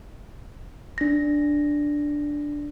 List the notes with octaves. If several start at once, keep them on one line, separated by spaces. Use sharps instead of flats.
D4 A#6